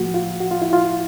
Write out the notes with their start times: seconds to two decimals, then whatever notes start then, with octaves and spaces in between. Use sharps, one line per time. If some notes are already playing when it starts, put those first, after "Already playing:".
Already playing: A2 F3 A#3 F#4
0.14 F4
0.40 F#4
0.51 F4
0.62 E4
0.73 F4